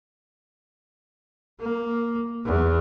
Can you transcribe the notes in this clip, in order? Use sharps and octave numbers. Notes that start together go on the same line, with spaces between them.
A#3
E2